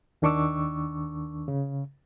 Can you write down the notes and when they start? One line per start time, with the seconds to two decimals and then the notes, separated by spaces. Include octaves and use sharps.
0.22 D#2 D#3 D4 C#6 D6 E6
1.48 C#3